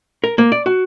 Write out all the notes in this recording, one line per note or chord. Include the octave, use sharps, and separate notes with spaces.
A#4
A#3
D5
F#4